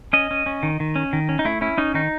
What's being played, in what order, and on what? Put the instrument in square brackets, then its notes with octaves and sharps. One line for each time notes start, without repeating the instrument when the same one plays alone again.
[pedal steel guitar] C#4 D#5
C#4
C#4
D#3
D#3
C#4
D#3
C#4
D#4
A3 E4
C#4 E4
C#4 D#4
D#3 D#4